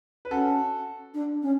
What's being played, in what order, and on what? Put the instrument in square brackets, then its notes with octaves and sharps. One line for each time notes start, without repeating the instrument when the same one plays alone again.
[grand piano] B4
[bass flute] C#4 [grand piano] F#4 A4
[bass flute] D4
C#4